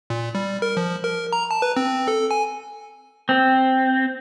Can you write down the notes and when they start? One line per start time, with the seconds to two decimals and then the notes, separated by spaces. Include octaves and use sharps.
0.10 A#2
0.35 G3
0.62 A#4
0.77 F3
1.04 A#4
1.33 A#5
1.51 A5
1.62 B4
1.77 C4
2.08 A4
2.31 G#5
3.29 C4